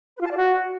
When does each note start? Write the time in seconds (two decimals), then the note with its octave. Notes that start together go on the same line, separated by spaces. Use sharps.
0.16 B4
0.21 F4
0.26 A5
0.31 D5
0.36 F#4